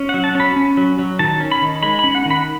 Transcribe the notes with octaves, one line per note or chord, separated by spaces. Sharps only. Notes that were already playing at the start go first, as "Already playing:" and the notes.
Already playing: C#4
F#3 F#5
A5
C#4 B5
C#4
F#3
F#3
D#3 A5
C#4
B5
D#3
G#3 B5
C#4 B5
F#5
D#3 B5